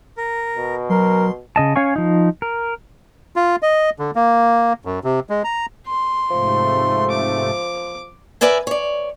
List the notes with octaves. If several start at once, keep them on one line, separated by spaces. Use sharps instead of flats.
A#4
B2
F#3 A#4 C6
C#3 D#5 A5
C#4 C#5 F5 G#5 C#6
F3 D#4
A#4
F4
D#5
D3
A#3
F#2
C3
G#3
A#5
C6
G#2 C3 F3 A3
D6
A#4 B4 D5 E5 G#5
C#5 D5